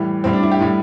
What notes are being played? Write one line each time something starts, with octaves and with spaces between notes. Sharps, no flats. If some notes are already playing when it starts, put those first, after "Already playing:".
Already playing: A2 E3 G3
A2 G3 C4
D4
E4
G4
A2 G3